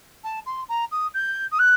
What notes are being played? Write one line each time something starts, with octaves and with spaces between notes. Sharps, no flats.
A5
C6
A#5
D#6
G6
D#6
F#6